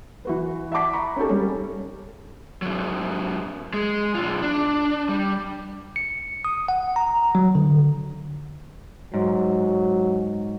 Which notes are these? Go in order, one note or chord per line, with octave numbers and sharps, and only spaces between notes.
E3 F#4 B4
E5 F#5 A5 D6 B6
A#5 B5 C#6
C#4 D#4 G4 A4
G3 G#3 C#4
G#2 F#3
G#3
B1 F4
D4
G3
C#7
D#6
F#5
A#5
F#3
D3
G#2 F#3